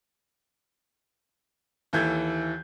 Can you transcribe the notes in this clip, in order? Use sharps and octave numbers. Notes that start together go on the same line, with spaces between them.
D#2 E3 A4 G6 G#6